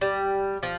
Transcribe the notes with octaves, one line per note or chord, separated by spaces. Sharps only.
G3
F3